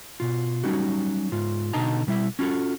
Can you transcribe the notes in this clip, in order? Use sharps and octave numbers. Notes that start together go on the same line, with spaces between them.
B2 F4
F#3 G3 C#4 D#4 F#4
G#2 F4
B2 D3 D#4 D#5 A5 A#5
B2 G3 E4 E5
C#4 F4 F#4 A4